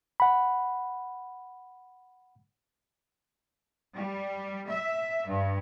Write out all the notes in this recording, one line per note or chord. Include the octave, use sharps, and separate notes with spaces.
F#5 B5
G3
E5
G2